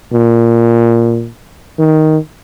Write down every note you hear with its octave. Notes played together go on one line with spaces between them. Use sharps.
A#2
D#3